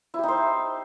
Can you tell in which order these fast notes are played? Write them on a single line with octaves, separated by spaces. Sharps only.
E4 G4 D#4 C5